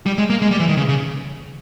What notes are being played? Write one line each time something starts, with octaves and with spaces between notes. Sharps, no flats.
G3
G#3
A#3
G#3
G3
E3
D#3
C#3
C#3